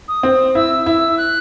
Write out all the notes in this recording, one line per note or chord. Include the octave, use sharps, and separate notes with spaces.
D#6
C4
E4 E6
E4 E6
F#6